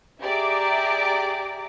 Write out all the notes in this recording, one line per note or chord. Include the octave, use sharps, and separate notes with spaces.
G4 G#4 D5 E5 A#5 D6